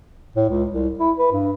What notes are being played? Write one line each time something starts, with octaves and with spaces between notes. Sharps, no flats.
A2
C#2
C2
E4
B4
G2